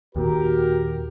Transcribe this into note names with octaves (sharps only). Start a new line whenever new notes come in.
D#2 A#2 F#4 G4 A#4